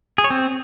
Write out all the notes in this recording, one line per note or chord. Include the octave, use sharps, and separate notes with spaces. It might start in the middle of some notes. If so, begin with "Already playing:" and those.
G#4
C#5
C4